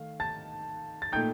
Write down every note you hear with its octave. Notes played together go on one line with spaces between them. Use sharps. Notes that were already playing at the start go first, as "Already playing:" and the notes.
Already playing: D#3 A3 F5
A5 A6
A6
A#2 A3 D#4 G5 G6